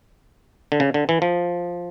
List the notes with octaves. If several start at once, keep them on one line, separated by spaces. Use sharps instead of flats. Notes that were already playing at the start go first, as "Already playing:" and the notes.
D3
C#3
D3
E3
F3